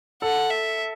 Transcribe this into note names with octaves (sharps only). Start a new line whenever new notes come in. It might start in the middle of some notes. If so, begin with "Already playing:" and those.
A4 F#5
E5